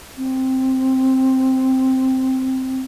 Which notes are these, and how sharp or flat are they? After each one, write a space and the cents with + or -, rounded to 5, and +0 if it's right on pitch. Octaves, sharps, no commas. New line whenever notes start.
C4 +0